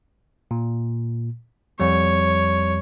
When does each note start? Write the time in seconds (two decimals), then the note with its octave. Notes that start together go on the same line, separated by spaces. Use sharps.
0.51 A#2
1.80 F2 G3 C#5